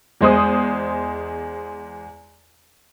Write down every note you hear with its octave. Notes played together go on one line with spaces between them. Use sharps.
E2 G#3 C5 D#6